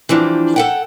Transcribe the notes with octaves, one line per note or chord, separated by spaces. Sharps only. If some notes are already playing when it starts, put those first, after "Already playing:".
E3 F3 G3 D4
A4 F#5 G5